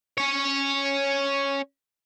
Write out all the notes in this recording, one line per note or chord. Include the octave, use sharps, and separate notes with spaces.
C#4 C#5